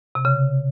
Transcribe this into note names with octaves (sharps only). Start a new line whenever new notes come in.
C3
C#3